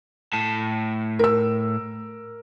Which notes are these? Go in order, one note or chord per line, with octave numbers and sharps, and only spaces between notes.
A2 A5
A#4 E6